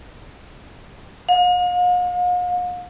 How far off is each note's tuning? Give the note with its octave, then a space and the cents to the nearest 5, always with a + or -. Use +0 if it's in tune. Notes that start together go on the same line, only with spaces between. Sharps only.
F5 +45